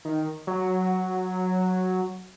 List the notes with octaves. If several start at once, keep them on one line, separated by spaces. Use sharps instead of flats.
D#3
F#3